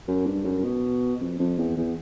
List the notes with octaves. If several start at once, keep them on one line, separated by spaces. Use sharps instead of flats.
F#2
G2
F#2
B2
F2
F2
E2
E2